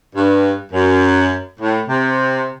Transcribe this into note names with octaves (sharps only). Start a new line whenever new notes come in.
G2
F#2
A2
C3